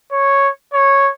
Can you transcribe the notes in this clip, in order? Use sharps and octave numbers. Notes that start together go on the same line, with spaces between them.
C#5
C#5